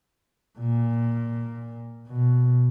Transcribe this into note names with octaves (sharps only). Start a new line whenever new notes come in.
A#2
B2